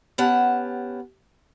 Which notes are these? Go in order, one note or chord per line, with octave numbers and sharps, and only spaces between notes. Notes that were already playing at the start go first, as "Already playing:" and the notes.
B3 C#4 G4 F#5 A5